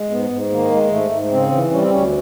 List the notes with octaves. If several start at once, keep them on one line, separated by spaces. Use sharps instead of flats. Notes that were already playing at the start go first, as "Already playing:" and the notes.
Already playing: G#3
G#2 B3
G#2
D#3 A#3
G#3
G#2 A3
G#2
C#3 C4
E3
G3 C#4
C4
D2 C#4